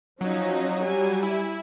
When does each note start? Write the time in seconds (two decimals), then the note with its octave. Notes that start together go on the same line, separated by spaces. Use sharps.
0.21 F3 F#3 C#4 D#4
0.83 G3 G#5
1.23 E4